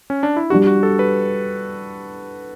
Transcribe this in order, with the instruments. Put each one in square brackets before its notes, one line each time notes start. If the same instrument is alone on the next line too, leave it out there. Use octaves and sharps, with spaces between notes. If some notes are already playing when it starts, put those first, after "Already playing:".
[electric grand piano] C#4
D4
E4
[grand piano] G3 D4 G4 [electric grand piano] F#4
[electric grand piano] F#4
A4
B4